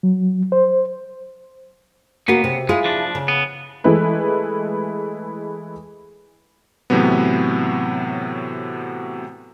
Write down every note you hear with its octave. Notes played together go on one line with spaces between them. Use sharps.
F#3
C5
C#3 A#3 B3 F#4
C3
G#3 E4 F4 G#4
F3 D4
C#3
B3
E3 G#3 A3 E4 B4
A2 C3 E3 F#3 B3